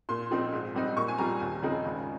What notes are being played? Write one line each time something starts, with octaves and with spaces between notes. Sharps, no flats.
A#2 C6
F3 C4 D#4
G#2
G3 C4 D#4
A#2 C#6
G#5
G3 C4 F4 A#5
D#2 G#5
C#3 F3 C4 D#4
G#1